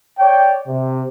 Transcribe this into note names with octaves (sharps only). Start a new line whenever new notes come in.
C#5 D5 G5
C3